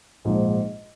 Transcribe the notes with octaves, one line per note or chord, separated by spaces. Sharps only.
A#1 G#2 F3